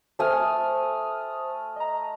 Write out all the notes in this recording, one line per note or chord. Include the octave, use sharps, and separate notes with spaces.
A3 C5 G#5 D#6 F6
D#5 A#5